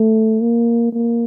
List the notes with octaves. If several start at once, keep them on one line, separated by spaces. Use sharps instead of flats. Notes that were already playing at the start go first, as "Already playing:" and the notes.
Already playing: A3
A#3
A#3